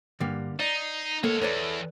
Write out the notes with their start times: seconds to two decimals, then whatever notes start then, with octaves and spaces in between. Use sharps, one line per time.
0.20 G2 D3 G3 A#3
0.59 D#4 D5 C7
1.24 G#3 A#3 A4 C#5
1.42 E2 A4 B4 C#5 D5